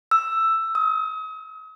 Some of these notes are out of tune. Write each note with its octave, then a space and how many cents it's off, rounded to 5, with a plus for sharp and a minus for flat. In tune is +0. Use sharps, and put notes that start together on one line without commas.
E6 +5
D#6 +40